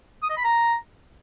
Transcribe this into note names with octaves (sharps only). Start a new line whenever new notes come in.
D#6
D#5
B5
A#5